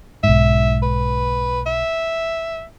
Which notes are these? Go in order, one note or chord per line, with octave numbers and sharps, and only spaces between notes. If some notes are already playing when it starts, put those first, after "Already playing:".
B1 G#2 E5
B4
E5